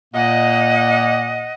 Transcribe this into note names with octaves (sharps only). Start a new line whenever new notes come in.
A#2 A#3 D#5 F#5